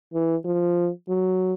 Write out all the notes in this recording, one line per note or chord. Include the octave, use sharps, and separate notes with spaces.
E3
F3
F#3